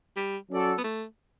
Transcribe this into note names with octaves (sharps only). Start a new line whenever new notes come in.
G3
F#3 C#4 F#4 A4 D5
B3
A3